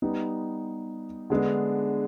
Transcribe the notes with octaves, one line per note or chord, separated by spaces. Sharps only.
G3 B3 D#4
D3 G#3 B3 D4